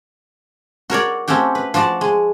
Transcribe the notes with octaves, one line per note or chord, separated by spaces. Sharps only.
F#4 A#4 C#5 D5
A3 C4 C#4 F#4 G4
B4
F3 F#4 D5 A5
G#3